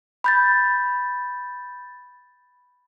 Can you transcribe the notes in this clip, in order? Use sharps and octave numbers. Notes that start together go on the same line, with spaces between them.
B5 G6 A6